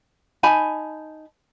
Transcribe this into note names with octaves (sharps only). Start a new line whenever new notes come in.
D#4 G#5 A5 B5